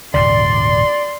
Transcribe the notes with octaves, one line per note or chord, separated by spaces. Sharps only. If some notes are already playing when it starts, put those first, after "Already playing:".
D#1 G#2 C#3 D5 C6